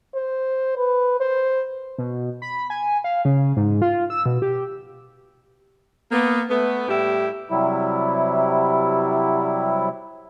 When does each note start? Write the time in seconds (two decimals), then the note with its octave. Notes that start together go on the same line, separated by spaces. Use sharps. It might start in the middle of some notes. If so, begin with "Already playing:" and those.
0.15 C5
0.77 B4
1.20 C5
1.98 B2
2.42 B5
2.70 G#5
3.04 F5
3.25 C#3
3.57 G#2
3.82 F4
4.10 E6
4.26 B2
4.42 G4
6.12 A#3 B3
6.50 A3 B3
6.88 A2 G3 E4 G4
7.51 C3 F#3 G3 E4